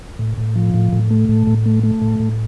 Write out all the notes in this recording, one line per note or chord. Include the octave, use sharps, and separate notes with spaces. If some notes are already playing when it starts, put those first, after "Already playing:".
A2
A2
F3
A2
A2
A3
A2
A2
A3
A3
A2
A2